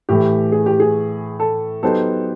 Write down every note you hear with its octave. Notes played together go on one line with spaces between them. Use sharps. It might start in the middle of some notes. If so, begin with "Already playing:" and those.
A2 E3 A3 G4
G#4
G4
G#4
A4
F#3 B3 D#4 G4 A4 C5